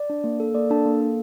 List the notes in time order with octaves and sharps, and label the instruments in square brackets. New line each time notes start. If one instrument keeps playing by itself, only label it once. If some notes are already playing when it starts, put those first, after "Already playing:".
Already playing: [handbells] D5
D4
A#3
A4
A#3 D5
D4 A4 A5
A#3
A4